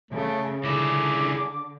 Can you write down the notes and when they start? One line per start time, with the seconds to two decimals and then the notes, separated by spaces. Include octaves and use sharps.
0.11 C#3 A3
0.64 C#2 D3 E4 G#4 D6